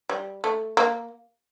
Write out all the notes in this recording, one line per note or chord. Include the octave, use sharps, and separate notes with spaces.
G3
A3
A#3